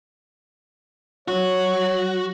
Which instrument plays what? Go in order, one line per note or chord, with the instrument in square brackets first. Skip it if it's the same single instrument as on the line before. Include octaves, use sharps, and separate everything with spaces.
[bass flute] F#3 [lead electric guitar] F#4 [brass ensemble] C#5